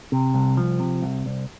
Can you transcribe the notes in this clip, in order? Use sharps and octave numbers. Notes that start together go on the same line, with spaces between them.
C3
C2
F3
C3
C2
C2